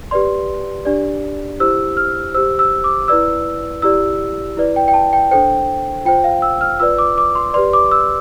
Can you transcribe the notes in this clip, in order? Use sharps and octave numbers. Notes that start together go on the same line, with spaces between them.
G4 B4 D5 C6
D4 G4 D5
E4 G4 C5 E6
F6
G4 C5 E6
E6
D6
E4 B4 D5 E6
E4 G4 D5 E6
E4 B4 D5
G5
G5
A5
G5
D4 A4 C5 G5
F4 C5 G5
F5
E6
F6
F4 B4 D5 E6
D6
D6
C6
G4 B4 D5 C6
D6
E6